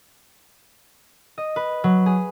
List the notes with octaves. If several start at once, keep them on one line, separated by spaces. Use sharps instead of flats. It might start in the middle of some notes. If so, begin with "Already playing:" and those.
D#5
B4
F#3
G#4